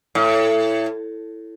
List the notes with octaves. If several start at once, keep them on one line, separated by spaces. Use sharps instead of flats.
A2